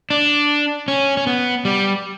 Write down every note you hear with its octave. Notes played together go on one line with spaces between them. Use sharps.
D4
C#4
C#4
B3
G3